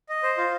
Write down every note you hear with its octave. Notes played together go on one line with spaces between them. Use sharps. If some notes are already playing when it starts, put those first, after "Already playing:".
D#5
C5
F4